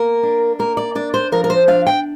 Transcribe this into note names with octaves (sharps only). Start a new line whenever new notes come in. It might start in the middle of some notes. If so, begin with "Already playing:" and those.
Already playing: A#3 A#4
D4
A#3 A#4
D5
D4 D5
C5
F3 A#4
A#4
C5
D4 F5
G5